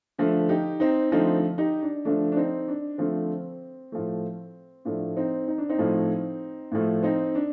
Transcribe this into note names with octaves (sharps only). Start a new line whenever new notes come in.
D3 F3 A3
D#4 G4
C4 D#4
D3 F3 A3 C4 D#4
D#4 G4
D4
D3 F3 A3 D4
D4
C4 D#4
D4
D3 F3 A3 C4
A2 F3 A3
A2 F3 A3 D4
C4 D#4
D#4
D4
C4 D#4
A2 F3 A3
A2 F3 A3
C4 D#4
D4